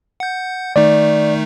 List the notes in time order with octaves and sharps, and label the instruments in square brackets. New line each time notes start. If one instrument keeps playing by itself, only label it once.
[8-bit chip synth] F#5 G6
[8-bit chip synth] D#3 A3 D#4 [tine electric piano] D5